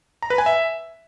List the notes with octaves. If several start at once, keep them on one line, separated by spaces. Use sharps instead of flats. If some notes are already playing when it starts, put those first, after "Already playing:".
A#5
B4
G#5
E5